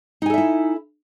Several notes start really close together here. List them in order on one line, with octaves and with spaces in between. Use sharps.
D#4 G#5 A4 E5 E4